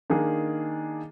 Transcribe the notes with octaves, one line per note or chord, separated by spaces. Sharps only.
D#3 A#3 D4 G#4